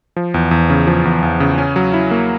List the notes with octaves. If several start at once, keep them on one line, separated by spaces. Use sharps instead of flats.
F3
E2
E2
C#3
F3
E2
E2
C#3
C#4
F#3
E4
A#3